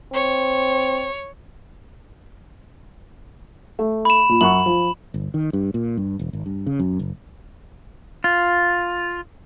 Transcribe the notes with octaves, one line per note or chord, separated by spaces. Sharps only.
C4 C#5
A3
B5 E7
A#2
F#2 F#5 C#6 F#7
F3
G1
D#3
G2
A#2
G2
E1
G#1
G2
C#3
F#2
F#1
F4